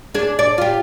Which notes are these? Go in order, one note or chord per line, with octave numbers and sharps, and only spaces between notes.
D4 G#4
D5
F4 G4